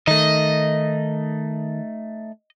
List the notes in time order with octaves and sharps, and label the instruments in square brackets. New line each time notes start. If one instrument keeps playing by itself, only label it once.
[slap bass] D#3 [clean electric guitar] A3 D#4 [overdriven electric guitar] D#5